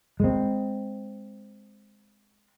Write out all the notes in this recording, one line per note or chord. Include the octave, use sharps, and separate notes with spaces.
G#3 C4